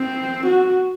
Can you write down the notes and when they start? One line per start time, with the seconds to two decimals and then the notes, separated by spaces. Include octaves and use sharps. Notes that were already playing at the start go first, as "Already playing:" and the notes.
Already playing: C4
0.47 F#4